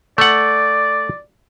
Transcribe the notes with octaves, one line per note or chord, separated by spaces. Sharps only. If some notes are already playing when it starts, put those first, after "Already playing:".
A3 D5 F#5